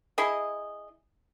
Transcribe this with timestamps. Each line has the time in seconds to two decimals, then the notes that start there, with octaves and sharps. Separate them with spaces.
0.18 E4 G#4 D#5